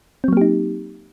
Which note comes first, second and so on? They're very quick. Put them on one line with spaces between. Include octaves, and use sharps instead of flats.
C4 F#3 A#3 G4 D#4